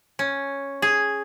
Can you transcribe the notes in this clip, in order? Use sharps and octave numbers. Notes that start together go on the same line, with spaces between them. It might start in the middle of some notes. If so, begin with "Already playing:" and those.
C#4
G#4